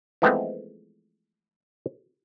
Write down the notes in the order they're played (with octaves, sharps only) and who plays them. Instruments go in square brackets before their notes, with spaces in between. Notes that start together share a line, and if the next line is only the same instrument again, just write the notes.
[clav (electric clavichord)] E3 F3 G#3 A3 B3 C4